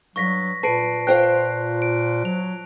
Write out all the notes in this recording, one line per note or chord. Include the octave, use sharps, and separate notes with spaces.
G2 F#3 C#6 A#6 B6
A#2 B4 A5 C7 D7
F4 C5 G5 F#6
D7
F#3 F7